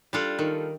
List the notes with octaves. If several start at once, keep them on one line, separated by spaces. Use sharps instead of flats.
G3 D4 F4 A4
D#3